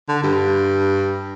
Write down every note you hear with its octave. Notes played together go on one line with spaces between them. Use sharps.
D3
G2